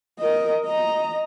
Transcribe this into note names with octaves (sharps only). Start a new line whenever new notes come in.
A#4 D#5
D#5 A#5